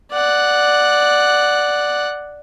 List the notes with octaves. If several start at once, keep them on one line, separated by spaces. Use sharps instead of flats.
D5 F#5